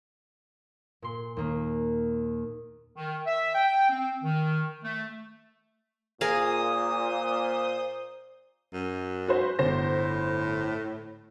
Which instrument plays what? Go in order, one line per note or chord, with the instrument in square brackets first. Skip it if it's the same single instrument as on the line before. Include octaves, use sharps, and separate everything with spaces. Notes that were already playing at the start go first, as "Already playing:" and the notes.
[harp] A#2 C6
D#2 A#3
[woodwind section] D#3
E5
G5
C4
D#3
A3
[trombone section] A#2 [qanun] G#4 A#4 F5 [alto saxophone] C5 [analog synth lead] D#6
[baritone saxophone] F#2
[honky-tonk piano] F#4 B4 C5
[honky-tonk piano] G1 C5 A#6 [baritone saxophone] A2